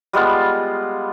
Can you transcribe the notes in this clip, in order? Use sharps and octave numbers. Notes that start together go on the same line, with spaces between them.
G3 G#3 B3 F4